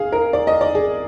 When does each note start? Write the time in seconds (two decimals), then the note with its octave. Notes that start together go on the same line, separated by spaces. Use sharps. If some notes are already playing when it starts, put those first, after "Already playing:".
Already playing: G#4 F5
0.12 A#4
0.33 D5
0.47 D#5
0.61 D5
0.75 G#4